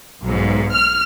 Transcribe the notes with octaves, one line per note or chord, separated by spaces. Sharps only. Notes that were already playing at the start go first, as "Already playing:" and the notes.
B1 G#2
F6